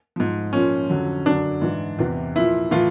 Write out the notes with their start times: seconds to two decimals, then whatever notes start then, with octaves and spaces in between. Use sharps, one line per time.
0.16 G#2 F3
0.53 A#2 F3 C#4
0.89 F2 D3 F#3
1.26 F#2 D3 F#3 D4
1.62 G#2 E3
1.99 E2 C3 E3
2.35 A#2 F3 E4
2.71 A2 E3 F4